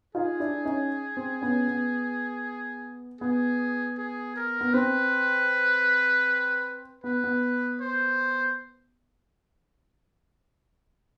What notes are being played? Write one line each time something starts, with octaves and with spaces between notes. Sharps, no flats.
D#4 F4 G#4
D4 E4
C#4 D#4
C4
B3 C#4
B3
B3 G#4
G#4
A#4
B3
C4 B4
B3 B4
B3
C5